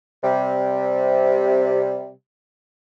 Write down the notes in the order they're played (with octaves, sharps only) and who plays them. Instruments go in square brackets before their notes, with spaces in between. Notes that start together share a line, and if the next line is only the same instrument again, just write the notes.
[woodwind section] C3 G3